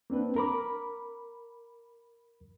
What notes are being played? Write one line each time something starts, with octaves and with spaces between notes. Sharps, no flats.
A#3 C4 D4 B4
A#4 B5 D6